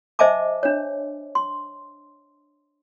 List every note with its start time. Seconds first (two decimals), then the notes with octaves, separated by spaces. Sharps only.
0.19 C5 D#5 E5 G#5 A5 D6
0.63 D4 C#5
1.35 C6